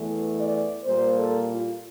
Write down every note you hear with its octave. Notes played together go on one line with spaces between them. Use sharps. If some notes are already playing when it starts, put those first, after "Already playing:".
Already playing: E2 E3 A3
D5
A#2 G3 A#3 C5
A4
F4